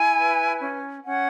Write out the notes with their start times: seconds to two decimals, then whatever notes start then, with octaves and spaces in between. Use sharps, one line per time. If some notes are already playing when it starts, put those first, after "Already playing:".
Already playing: E4 G#5
0.17 B4
0.60 C#4
1.04 C#4 F#5